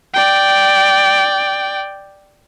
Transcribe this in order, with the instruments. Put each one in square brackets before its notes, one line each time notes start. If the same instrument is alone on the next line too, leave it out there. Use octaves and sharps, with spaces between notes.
[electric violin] D5 G5